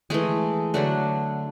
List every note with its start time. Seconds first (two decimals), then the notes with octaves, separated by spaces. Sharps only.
0.10 E3 G#3 A3 G#4
0.74 D3 F#3 A3 D4